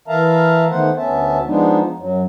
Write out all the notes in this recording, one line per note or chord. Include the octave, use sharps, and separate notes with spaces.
E3 A#4 E5 F5 A5 A#5
D#3 A3 B3 C5 F#5
D2 B3 C#4 E5 A5
F3 G#3 B3 D4 D#4
F#2 F#3